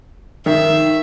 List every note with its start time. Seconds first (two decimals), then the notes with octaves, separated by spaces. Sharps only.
0.46 D#3 E5